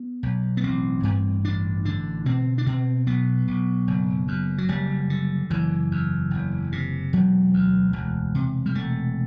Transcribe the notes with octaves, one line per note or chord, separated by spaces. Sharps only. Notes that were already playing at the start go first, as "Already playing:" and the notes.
Already playing: B3
B1
B3
A1 C4
G2
A1 D4
D3 D4
B2 C4
D4
B2 C4
B1 B3
B1
F#1
F#2
F#3
F#1 G3
D3
F#1 E3
E2
F#1
C3
E1 F#3
D2
E1
C3
G3
E1 A3